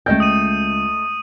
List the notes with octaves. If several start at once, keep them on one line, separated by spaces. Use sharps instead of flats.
C#2 A3 D#5 G5 G6
D#6 D#7